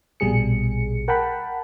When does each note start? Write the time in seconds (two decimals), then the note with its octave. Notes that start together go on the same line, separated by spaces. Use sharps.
0.20 A#1 B2 G3 G#4 C#7
1.08 A#4 F#5 G5 A5 B5